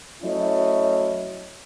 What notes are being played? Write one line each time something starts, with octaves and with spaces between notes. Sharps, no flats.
F#3 A3 C#4 E4 C#5 D#5